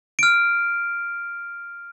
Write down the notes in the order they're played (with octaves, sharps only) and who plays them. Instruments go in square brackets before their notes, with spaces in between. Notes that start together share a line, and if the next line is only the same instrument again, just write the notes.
[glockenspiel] F6 D7